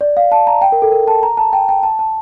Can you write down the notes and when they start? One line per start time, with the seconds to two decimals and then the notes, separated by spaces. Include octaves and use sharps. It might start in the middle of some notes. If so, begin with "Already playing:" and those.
0.01 D5
0.17 F5
0.32 A5
0.47 A#5
0.62 G5
0.72 A#4
0.82 A4
0.92 A#4
1.08 A5
1.23 A#5
1.37 A5
1.53 G5
1.69 G5
1.83 A5
1.99 A5